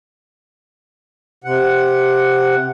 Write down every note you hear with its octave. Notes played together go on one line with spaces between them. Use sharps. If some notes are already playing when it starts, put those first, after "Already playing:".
C3 F#5